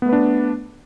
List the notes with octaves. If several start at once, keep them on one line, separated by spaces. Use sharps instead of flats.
A3 B3 D4 B4